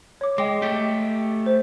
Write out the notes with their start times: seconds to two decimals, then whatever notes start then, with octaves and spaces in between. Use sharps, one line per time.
0.21 C#5 D6
0.38 G#3 D#5 G5 D6
0.62 A3 G4
1.46 C5